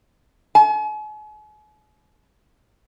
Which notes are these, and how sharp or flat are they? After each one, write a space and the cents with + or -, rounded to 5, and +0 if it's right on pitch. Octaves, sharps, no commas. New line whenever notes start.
G#5 +45